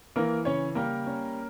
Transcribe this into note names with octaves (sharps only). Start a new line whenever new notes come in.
E3 A#3 A#4
C#3 C#4 C#5
G3 A#3 A#4
C#4